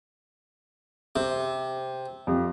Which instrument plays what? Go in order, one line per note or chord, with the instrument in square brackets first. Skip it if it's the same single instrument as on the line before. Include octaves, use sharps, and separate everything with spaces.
[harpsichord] C3
[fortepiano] F2 G4